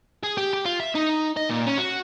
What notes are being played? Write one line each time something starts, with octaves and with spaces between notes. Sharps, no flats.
G#4
G4
G4
F4
E5
D#4
D#5
A#2
C#4
F#4